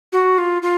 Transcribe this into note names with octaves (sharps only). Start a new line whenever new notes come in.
F#4
F4
F4